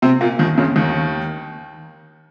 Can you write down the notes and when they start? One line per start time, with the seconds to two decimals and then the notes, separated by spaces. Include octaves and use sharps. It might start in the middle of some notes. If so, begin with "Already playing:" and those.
0.02 C3 C4
0.21 A#2 A#3
0.39 D#2 D#3
0.58 C#2 C#3
0.76 D#2 D#3